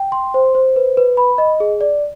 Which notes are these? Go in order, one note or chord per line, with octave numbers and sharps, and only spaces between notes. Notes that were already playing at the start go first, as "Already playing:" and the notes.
Already playing: G5
C6
C5
C5
B4
B4
B5
D#5
G#4
D5